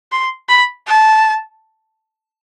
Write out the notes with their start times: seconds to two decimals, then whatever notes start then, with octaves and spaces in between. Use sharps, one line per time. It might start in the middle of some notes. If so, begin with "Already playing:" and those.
0.12 C6
0.49 B5
0.87 A5